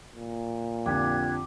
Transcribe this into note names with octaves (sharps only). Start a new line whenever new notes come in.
A#2
F2 D3 F3 G4 F#6 G#6